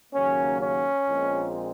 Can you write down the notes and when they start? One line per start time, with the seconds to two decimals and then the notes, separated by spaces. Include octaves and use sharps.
0.13 D#2 C#3 F#3 A#3 C#4
0.60 C#4
1.08 A#1 A#2 G#3 C4